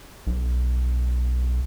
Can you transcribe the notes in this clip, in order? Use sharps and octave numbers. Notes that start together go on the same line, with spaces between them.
B1